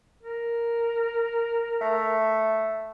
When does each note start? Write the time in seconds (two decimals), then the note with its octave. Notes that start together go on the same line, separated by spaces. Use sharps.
0.23 A#4
1.81 A3